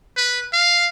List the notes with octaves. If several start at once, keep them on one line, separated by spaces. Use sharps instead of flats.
B4
F5